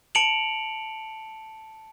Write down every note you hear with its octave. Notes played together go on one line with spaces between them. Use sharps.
A5 C#7 D7 F7 F#7